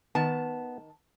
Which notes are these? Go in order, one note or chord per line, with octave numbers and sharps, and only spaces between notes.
D#3 B3 A5